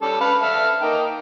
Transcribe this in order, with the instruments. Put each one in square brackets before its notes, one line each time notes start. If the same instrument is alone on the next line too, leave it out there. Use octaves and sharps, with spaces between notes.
[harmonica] G3 C#4 A4
B4 F5
A4 E5 F6
A#3 D#4 G5